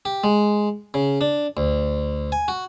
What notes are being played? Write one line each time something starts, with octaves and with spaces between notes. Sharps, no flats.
G4
G#3
C#3
D4
D2
G#5
F#4